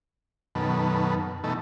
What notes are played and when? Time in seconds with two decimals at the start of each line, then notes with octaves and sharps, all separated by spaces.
0.55 F#2 B2 D#3 A4 B4
1.44 B2 E3 A3 D#4 A4